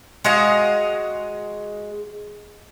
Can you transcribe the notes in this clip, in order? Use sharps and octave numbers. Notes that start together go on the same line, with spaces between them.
G#3 F#4 D#5 F5